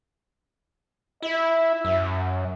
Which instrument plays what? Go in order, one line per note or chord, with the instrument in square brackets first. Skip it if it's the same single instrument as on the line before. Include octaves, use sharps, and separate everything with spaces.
[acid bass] E4 [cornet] E5
[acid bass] F#2